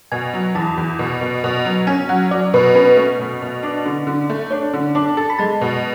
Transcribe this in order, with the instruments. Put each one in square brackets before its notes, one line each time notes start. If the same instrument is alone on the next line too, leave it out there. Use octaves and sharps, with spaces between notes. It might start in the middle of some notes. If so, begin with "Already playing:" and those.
[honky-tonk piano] B2 [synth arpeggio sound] G#5
[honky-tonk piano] F#3
[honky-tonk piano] E2 [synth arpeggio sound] A5
[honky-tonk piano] E2
B2
B2
B2
F#3
[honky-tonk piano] C#4 [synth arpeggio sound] G#5
[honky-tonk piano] F#3 [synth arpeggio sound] F#5
[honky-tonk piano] F#3 [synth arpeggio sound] D5
[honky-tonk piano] B2 [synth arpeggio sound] B4
[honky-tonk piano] C#4 [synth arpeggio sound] B4
[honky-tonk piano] A3
B2
B2
D4
D3
D3
A3
[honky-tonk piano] D4 [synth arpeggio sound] C#5
[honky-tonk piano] D3
[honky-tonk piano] D4 [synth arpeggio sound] D5
[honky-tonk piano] A4
[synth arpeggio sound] B5
[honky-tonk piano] G#3 [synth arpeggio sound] A5
[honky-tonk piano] B2